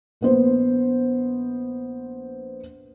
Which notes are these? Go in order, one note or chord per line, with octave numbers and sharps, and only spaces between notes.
A#1 B3 C5